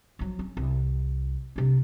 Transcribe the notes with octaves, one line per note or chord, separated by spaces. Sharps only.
F3 F#3
C#4
C2
C3 D4